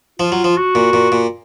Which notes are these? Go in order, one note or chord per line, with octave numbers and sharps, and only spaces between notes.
F3 F4
F#3
F3
F#4
A#2
A#2
A#2